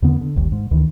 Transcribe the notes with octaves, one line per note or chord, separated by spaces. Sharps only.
E2 D3 B3
D3
G1 D#2
G#2
D2 D#3 E3